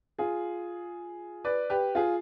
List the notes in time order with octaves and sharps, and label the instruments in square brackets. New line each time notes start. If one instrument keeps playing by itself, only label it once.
[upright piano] F4 G#4
B4 D5
G4 B4
F4 G#4